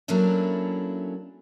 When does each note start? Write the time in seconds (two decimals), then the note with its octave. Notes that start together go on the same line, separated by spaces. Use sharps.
0.08 F#3 A3 A#3 C#4 D4 E4